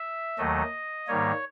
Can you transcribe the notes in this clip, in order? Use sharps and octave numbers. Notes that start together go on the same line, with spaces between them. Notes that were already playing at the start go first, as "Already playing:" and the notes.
Already playing: E5
D#2 D#3 F#3 A3 D#5
G#2 D#3 G3 A#3 C#5